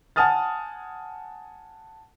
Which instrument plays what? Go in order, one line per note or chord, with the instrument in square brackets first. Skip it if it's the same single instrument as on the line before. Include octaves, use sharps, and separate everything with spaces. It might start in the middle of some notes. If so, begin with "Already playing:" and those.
[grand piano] F#5 G#5 A5 D#6 F6 A6